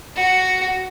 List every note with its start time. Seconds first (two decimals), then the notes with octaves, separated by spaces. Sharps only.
0.16 F#4